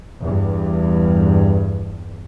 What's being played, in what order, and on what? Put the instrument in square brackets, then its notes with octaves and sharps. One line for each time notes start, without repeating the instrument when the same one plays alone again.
[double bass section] E2 G2